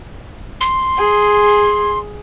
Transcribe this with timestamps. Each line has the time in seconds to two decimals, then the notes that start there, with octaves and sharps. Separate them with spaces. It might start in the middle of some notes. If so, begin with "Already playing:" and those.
0.61 C6
0.98 G#4